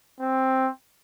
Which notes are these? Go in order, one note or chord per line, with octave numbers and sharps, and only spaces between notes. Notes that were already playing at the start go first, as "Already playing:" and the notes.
C4